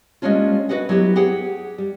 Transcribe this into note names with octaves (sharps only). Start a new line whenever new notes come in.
G3 G#3 A#3 C#4 D4 F4
F#4 G#4 B4 D#5 F#5
F#3 B3 E4 G4
G4 G#4 F#5 G5
G3